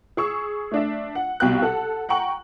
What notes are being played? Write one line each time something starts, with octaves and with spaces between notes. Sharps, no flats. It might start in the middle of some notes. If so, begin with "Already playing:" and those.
G#4 C#6 E6
A3 D4 E5
F#5
C2 B2 F5 G5 F#6
A4 F#5
F#5 G5 A#5 C#6 F#7